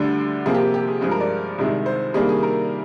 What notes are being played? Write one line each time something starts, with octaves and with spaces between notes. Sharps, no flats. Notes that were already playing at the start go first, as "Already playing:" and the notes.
Already playing: D2 D3 G3 D4
C3 F3 A#3 G#4
G4
G4
G#4
G2 F3 G#3 G#4
A#4
D5
C2 C3 D#3 G#3
C5
C3 D#3 G3 A#3 D4 G#4
G#4
A#4